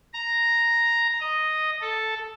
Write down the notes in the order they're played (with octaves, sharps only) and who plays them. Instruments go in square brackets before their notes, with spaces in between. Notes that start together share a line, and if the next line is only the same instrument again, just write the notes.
[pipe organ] A#5
D#5
A4